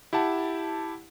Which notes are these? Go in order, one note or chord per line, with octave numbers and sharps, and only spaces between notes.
E4 G4 F#5 A5